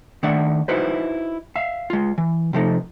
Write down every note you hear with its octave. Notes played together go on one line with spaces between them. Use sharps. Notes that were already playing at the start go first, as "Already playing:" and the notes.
D#3 A3 D4 E5 F#5
D#4 E4 F#4 B4 C5
E5 F5
G#3 F4
E3
C3 F3 A3 D#4